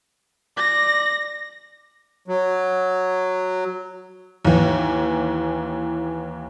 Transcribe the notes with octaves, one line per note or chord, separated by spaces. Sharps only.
D5 A#6
F#3
D#2 E3